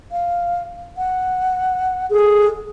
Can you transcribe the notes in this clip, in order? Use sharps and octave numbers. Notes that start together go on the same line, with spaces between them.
F5
F#5
G#4 A4